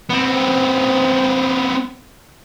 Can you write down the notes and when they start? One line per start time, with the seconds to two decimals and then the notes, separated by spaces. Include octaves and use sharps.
0.10 B3 C4